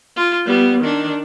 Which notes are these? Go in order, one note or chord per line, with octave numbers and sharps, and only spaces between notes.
F4
G3 B3
D#3 D4